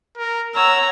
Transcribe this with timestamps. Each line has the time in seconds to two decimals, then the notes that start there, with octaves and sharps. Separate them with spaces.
0.18 A#4
0.55 C#5 F#5 A#5 E6